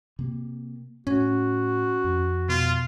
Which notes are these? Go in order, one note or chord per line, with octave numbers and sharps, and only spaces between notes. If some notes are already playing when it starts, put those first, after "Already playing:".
C3 A#3
A2 C#4 F#4
F2
B2 F4